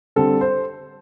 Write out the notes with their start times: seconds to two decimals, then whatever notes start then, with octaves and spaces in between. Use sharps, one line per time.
0.16 D3 G3 C4 A4
0.41 C5